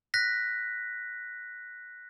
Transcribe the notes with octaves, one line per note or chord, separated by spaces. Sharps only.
F#6 A#6 B6